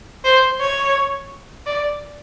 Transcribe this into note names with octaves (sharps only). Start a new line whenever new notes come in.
C5
C#5
D5